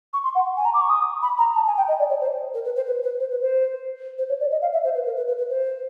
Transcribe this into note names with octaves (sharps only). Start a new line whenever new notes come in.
C#6
C6
F#5
G#5
A#5
D6
C#6
D#6
B5
A#5
A5
G#5
G5
D#5
D5
C#5
C5
A#4
B4
C5
B4
B4
C5
B4
C5
C5
C#5
D5
D#5
F5
E5
C5
B4
A#4
B4
B4
B4
C5